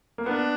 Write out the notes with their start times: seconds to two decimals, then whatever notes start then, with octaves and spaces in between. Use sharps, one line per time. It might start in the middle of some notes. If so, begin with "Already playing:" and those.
0.18 A#3
0.26 B3 D4